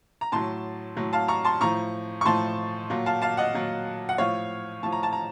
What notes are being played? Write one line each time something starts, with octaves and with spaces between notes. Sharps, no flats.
A#5
A2 F#3 A5 C6
A2 F#3
F5 A5
A#5 C#6
A5 C6
A2 F3 A#5 C#6
C#6
A2 F3 A5 C6
A#2 F#3
F5 A5
F5 A5
D#5 F#5
A#2 F#3
F#5
A2 F3 C#5 F5
A2 F3 A5
A#5
A5
A#5